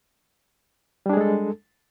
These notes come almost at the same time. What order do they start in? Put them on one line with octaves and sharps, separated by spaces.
G3 D4 G#4 G#3 A4